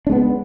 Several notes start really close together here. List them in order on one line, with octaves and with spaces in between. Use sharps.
D4 G#3 B3